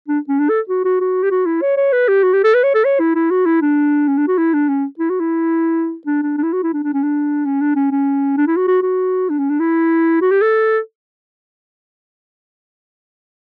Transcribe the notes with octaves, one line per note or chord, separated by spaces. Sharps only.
D4
C#4
D4
A4
F#4
F#4
F#4
G4
F#4
E4
C#5
C#5
B4
G4
F#4
G4
A4
B4
C#5
A4
C#5
E4
E4
F#4
E4
D4
C#4
D4
F#4
E4
D4
C#4
E4
F#4
E4
D4
D4
D4
E4
F#4
E4
D4
D4
C#4
D4
C#4
D4
C#4
C#4
D4
E4
F#4
F#4
F#4
D4
C#4
D4
E4
F#4
G4
A4